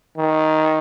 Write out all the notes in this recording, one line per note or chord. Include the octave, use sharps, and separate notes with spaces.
D#3